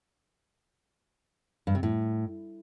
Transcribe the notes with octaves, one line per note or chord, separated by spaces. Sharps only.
G2
C3
A2